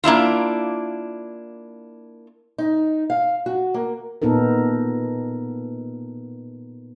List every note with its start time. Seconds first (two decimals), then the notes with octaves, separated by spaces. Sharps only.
0.04 A#3 D4 E4 F4
2.58 D#4
3.10 F5
3.46 F#4
3.74 A#3
4.22 A#2 B3 D#4 A4 A#4